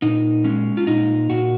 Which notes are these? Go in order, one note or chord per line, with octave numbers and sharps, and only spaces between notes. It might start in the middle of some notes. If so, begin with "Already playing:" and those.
A#2 D#4
G#3 C#4
F4
A#2 D#4
A#2 F#4